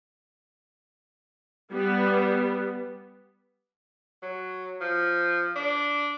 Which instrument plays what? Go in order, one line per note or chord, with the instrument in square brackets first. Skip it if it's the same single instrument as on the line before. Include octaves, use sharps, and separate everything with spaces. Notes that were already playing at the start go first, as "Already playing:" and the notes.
[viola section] G3 B3
[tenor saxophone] F#3
F3
D4